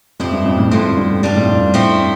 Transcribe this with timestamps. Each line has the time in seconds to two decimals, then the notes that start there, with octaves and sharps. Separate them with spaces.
0.20 F2 F3 C4 E4 G4
0.32 G2
0.45 F2
0.58 F2 A2
0.70 F2 A2 D3 F3 C4
0.97 G2
1.22 G2 G3 D4 F4
1.35 F2 A2
1.48 F2 A2
1.61 G2
1.74 F2 A2 F3 A3 C4 G4